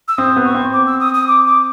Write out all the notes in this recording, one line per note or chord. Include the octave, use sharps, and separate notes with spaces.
E6
C4 D#6
B3
C#6
C4
D6
E6
D#6
D#6
D6
D6